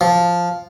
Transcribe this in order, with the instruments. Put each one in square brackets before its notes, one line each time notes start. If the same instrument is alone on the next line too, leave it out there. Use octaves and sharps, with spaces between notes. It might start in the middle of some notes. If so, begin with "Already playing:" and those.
[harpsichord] F3